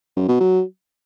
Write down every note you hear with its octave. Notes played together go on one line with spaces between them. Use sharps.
F#2
B2
F#3